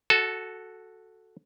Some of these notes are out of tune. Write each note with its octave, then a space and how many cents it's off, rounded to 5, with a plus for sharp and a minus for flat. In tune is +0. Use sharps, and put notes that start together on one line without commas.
F#4 +0 A4 +0 A5 -30